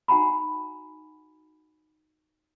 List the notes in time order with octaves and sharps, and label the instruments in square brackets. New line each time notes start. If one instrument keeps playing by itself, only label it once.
[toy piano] D#4 F#4 F#5 G#5 A#5 B5